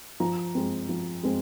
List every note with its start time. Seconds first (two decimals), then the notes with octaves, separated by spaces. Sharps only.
0.20 F3 A#5
0.55 G#3 C4
0.89 F3
1.23 G#3 C4